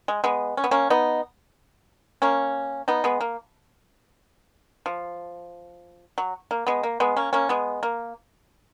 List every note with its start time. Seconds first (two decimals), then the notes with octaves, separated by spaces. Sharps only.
0.08 G#3
0.24 G#3 B3
0.57 C#4
0.64 B3
0.71 A#3 C#4
0.90 B3 D#4
2.22 A#3 C#4
2.88 B3 D#4
3.04 G#3 B3
3.21 A#3
4.86 F3
6.18 F#3
6.51 A#3
6.67 G#3 B3
6.83 A#3
7.00 G#3 B3
7.16 A#3 C#4
7.33 A#3 C#4
7.49 G#3 B3
7.83 A#3